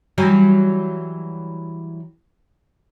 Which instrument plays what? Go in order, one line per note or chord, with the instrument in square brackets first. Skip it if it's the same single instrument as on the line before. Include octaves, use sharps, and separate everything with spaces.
[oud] E3 F#3 G3